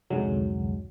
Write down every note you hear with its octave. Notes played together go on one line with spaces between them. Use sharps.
C2 F2 G#2 D3 F#3 G#3